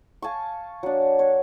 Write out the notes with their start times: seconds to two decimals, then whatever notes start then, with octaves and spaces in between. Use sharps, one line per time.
0.22 F5 G#5 A5 C#6
0.83 F#3 D4
1.19 C#5